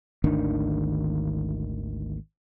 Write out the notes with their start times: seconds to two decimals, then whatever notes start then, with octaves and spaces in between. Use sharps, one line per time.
0.24 G#1 D2 D#3 D4